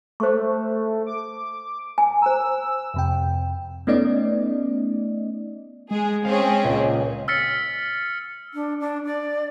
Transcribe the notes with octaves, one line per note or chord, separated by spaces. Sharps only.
A3 C5 C#6
D6
G#5
C5 A#5 E6
F2 C3 G5
A3 B3 C#4 D#4 D5 D#5
G#3 G#4
C4 C#4 G#4 F5
C#2 A#2
E6 F6 A6 B6 C#7
D4
D4
D5